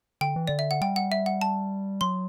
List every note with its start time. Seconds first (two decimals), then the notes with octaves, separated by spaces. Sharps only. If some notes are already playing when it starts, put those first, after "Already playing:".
0.21 D3 G5
0.36 E3
0.48 D3 D5
0.59 E5
0.71 F#5
0.81 G3 G5
0.96 F#5
1.12 E5
1.26 F#5
1.41 A5
2.01 F#3 C6